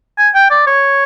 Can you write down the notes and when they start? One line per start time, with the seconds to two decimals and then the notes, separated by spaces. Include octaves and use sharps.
0.18 G#5
0.35 G5
0.50 D5
0.67 C#5